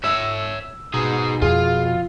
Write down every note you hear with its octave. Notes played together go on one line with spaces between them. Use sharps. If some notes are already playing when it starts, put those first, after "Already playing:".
C#5 E5 E6
B2 D#4 G#4
F2 F4 G#4